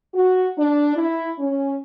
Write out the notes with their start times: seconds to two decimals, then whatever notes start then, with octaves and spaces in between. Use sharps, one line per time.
0.14 F#4
0.58 D4
0.96 E4
1.39 C#4